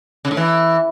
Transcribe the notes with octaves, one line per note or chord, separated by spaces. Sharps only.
C#3
A2
E3